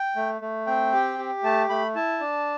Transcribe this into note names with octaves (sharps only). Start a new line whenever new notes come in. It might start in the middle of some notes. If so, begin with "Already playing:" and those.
Already playing: G5
A3
A3
C4 G5
G4
G4
A3 A5
A3 B5
E4 A5
D4